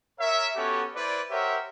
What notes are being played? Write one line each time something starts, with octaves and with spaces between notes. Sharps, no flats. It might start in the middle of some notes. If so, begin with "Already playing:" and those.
A#4 C#5 E5
B3 C#4 F#4 G4 A4 C#5
E4 B4 C5 D5
G4 A#4 C5 C#5 E5 F#5